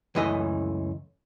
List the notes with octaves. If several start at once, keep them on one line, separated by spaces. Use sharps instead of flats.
C#2 F#2 E3 A3 D#5